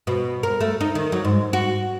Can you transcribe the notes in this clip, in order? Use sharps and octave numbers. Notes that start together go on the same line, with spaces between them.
B2
A#4
A3
D#4
D#3
F#3
G#2
F#4